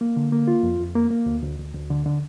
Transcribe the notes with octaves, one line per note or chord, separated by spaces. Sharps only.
A#3
D3
A#3
F4
F2
F2
A#3
A#3
D2
D2
D2
D2
D3
D3